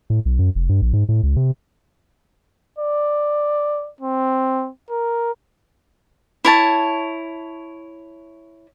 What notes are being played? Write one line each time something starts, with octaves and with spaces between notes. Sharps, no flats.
A2
B1
F#2
F1
G2
A#1
G#2
A2
C#2
C3
D5
C4
A#4
E4 C#5 A5